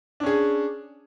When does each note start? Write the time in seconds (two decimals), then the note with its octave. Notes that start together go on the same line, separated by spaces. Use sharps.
0.20 D4
0.23 C#4
0.26 G#4